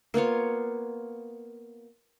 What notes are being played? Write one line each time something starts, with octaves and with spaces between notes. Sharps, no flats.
A#3 B3 F4 C#5